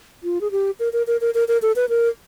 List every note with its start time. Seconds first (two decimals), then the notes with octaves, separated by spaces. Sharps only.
0.23 F4
0.41 G#4
0.51 G4
0.79 A#4
0.93 A#4
1.07 A#4
1.21 A#4
1.34 A#4
1.48 A#4
1.62 A4
1.76 B4
1.89 A#4